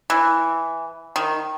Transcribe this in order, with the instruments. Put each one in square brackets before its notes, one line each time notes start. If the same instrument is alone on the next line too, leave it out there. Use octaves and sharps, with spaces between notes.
[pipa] E3
D#3